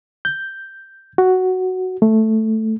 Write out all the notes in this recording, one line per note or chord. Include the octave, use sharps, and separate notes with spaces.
G6
F#4
A3